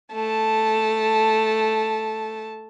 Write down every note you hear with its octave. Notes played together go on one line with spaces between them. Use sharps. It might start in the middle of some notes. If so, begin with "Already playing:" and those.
A3 A5